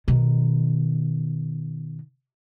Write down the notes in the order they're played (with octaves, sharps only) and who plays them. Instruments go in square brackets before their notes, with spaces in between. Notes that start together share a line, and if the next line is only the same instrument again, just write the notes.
[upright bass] B2 D#3